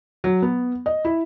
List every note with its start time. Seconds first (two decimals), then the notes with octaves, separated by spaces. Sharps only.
0.24 F#3
0.42 B3
0.86 D#5
1.05 E4